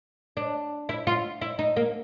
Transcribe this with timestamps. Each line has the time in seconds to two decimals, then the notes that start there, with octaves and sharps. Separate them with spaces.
0.37 D4
0.89 E4
1.07 F4
1.41 E4
1.59 D#4
1.76 A#3